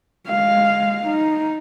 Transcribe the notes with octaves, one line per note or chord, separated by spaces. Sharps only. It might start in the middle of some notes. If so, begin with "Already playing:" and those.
G#3 F5
D#4